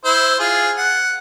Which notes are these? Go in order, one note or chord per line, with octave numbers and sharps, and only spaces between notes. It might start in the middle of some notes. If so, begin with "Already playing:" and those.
E4 C5
F4 G#4
F#5